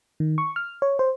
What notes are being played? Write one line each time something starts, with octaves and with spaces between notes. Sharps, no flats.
D#3
C#6
F6
C#5
C5